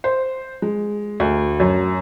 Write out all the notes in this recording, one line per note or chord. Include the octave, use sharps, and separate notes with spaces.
C5
G#3
D2
F#2